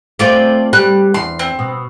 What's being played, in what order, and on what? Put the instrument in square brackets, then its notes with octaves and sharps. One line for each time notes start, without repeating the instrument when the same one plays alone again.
[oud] A3 C4 [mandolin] F4 D5
[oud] G3 [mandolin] F#6
[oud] E2 [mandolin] C6
[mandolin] C4
[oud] B2